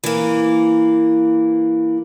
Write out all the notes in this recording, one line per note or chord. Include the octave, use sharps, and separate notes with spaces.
E3 A#3